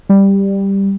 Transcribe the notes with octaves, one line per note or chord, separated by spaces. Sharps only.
G3